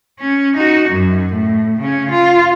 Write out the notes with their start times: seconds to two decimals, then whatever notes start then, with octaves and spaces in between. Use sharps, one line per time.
0.20 C#4
0.57 D#4 F#4
0.89 F#2
1.33 A2
1.80 C#3 C#4
2.11 F4